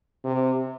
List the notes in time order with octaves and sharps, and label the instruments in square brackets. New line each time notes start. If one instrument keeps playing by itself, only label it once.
[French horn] C3